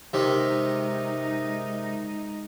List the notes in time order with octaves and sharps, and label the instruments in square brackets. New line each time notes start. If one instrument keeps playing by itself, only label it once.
[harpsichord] C3 D#3 [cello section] G#3 D#4